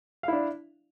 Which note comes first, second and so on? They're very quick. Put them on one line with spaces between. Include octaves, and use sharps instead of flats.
F5 E4 D4